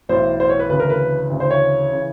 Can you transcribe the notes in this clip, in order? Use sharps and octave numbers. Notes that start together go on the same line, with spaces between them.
B1 A2 E3 C5
C5
C#5
B4
D2 C#3 E3 B4
A#4
B4
D2 C#3 E3
C5
C#5
C#3 E3